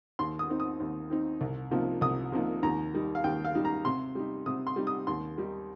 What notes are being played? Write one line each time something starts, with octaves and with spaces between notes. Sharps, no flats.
D#2 C6
D#6
D#3 C4 D#4
D#6
D#2
D#3 C4 D#4
C2
C3 F3 A#3 D#4
C2 D#6
C3 F3 A#3 D#4
D#2 A#5
D#3 G3 D#4
F5
D#2 G5
F5
D#3 G3 D#4
A#5
C3 C6
G3 D#4
C3 D#6
C6
G3 D#4
D#6
D#2 C6
D#3 G3 D#4